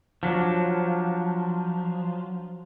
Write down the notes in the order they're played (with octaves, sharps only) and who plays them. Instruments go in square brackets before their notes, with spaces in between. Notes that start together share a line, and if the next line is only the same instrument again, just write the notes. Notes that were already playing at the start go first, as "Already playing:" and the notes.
[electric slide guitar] F3 F#3 D4